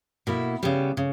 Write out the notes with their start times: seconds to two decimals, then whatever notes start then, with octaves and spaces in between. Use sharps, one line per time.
0.27 B2 A#3 E4
0.63 C#3 G3 B3
0.97 C#3